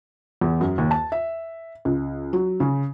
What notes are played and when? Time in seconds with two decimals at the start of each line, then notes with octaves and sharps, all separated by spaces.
0.41 E2
0.61 F#2
0.78 D#2
0.91 A5
1.12 E5
1.85 C#2
2.33 F#3
2.60 C#3